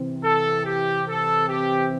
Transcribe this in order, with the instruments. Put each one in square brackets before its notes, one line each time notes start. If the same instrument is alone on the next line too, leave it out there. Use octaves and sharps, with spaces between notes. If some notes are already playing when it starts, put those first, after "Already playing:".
Already playing: [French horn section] C3 E3 C4
[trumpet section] A4
G4
A4
G4